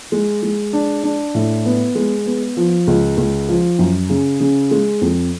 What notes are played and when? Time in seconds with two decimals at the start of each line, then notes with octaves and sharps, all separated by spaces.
0.12 G#3
0.43 G#3
0.73 D4
1.04 D4
1.35 A2
1.65 B3
1.95 G#3
2.26 B3
2.57 F3
2.87 C#2
3.17 C#2
3.49 F3
3.79 F#2
4.10 C#3
4.40 C#3
4.71 G#3
5.02 F2